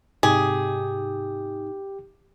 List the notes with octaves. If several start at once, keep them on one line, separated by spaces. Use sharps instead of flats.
G#2 C3 D#4 G4 G#4